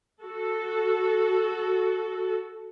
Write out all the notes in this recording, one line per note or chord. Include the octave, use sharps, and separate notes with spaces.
F#4 A4